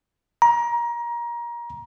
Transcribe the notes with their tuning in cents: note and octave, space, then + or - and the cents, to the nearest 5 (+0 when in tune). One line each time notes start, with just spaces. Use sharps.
A#5 +25